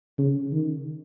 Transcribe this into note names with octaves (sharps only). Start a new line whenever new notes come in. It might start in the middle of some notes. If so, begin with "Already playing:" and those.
C#3
D#3